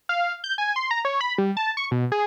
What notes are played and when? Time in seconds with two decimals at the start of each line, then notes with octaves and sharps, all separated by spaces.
0.09 F5
0.44 G6
0.58 G#5
0.76 C6
0.91 A#5
1.05 C#5
1.21 B5
1.38 G3
1.57 A5
1.77 C#6
1.91 B2
2.12 G#4